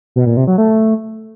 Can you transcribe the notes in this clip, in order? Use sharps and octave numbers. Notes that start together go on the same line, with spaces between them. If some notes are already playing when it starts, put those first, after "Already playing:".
B2
A#2
C3
F#3
A3